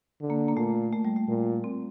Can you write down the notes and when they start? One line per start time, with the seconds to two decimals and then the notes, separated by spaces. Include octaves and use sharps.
0.21 D3
0.30 A#3
0.48 A#3
0.57 A#2 A3
0.93 A3
1.05 G3
1.16 A3
1.28 A#2
1.64 C4